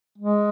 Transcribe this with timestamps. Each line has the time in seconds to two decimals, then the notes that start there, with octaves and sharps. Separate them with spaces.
0.18 G#3